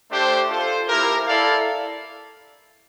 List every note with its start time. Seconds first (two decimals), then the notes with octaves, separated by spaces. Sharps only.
0.11 A3 D4 G4 C5
0.49 F4 A4 C5
0.88 A#3 E4 G4 A#4
1.27 E4 A4 D5 F5